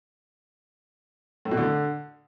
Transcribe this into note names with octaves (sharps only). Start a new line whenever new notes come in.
A2
B2
D3